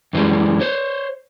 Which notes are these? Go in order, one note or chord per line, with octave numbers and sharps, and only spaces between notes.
F#2 E3 G3 G#3
C5 C#5